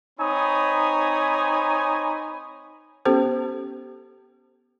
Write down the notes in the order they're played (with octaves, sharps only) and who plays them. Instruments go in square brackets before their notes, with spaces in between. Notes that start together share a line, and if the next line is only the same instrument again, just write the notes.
[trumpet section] C4 D#4 C#5 G#5 B5 D#6
[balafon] B3 C#4 G4 A4 C5